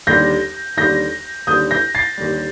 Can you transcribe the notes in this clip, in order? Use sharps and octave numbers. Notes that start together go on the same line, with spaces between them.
D#2 D3 G3 G6 A#6
D#2 D3 G3 G6 A#6
D#2 D3 G3 D#6 G6
G6 A#6
A6 C7
D#2 D3 G3